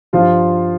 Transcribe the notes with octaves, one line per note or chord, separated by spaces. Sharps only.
G2 F3 F4